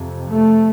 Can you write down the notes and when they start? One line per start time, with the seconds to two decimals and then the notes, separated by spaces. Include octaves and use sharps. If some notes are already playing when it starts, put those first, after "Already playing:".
Already playing: F2 C3
0.30 A3